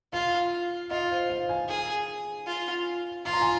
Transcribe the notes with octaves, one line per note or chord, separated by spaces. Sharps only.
F4 F5
F4 D#5
C5
F5
G#5
G#4
F4
F4 C6
A#5
G#5